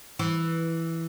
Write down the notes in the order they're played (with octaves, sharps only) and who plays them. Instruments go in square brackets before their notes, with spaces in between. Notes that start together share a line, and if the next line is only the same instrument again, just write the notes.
[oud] E3